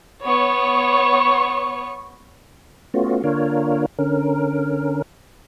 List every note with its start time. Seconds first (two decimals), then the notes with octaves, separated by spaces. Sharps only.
0.23 B3 C#5 C#6
2.94 A3 B3 C#4 F4 F#4
3.24 D3 A#3 D4 F4 A#4 C#5
3.99 D3 C#4 A#4